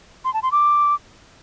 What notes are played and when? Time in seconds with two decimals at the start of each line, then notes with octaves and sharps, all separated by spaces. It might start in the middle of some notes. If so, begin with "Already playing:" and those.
0.24 C6
0.34 A5
0.43 C6
0.52 D6